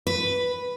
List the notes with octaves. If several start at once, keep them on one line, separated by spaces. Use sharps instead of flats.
B4